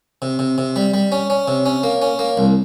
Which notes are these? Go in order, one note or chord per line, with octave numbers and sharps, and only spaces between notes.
C3
C3
C3
G3
G3
C#4
C#4
C3
C#4
A#3
C#4
A#3
C2